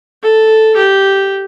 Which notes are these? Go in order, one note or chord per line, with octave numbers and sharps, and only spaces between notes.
A4
G4